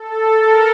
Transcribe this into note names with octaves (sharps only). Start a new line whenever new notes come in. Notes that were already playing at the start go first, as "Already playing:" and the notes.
Already playing: A4
A#4